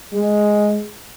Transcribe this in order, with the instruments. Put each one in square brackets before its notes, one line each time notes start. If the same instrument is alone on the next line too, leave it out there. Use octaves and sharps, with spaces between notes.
[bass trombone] G#3